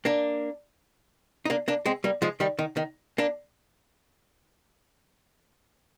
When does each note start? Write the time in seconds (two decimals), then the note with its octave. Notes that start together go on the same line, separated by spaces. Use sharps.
0.05 A#3 D4
1.45 D#4
1.50 A#3 D4
1.68 A#3 D4
1.86 G#3 C4
2.04 G3 A#3
2.22 F3 G#3
2.40 D#3 G3
2.59 D#3
2.77 D#3
3.18 A#3 D4